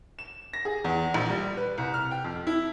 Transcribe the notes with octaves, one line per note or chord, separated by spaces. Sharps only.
E7
A#6
G#4
E2
A#1
G3
B4
C2
F6
G5
F2
E4